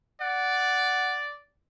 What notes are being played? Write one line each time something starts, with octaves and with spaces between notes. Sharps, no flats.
D5 F#5